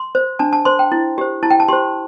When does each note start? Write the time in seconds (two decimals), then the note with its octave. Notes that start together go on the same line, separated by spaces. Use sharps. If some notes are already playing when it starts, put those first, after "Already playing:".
Already playing: C6
0.15 C5
0.39 D4 A5
0.53 A5
0.65 C5 C6
0.79 G5
0.92 E4
1.18 G4 C5
1.43 E4 A5
1.50 G5
1.60 A5
1.68 G4 C5 C6